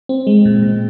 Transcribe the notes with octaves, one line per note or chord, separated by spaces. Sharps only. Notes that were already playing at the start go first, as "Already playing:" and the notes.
C4
G#3
A#2
A#2